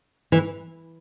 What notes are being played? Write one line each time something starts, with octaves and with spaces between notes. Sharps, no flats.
E3